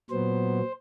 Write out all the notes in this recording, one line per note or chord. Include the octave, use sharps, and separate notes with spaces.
A#2 F#3 B3 C5